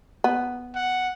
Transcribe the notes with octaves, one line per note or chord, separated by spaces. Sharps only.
B3
F#5